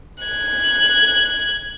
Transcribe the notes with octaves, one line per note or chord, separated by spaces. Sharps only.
F#6 G#6